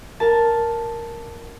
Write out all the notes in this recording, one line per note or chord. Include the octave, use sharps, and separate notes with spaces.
A#4 A5